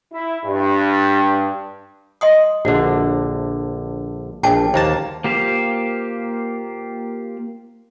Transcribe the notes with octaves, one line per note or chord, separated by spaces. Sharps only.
E4
G2
D#5 C6 D#6
A#1 D3 F#4
A#1 G5 A5 D6
D#2 A#3 C5 A5
A#3 F4 G4 C5 F5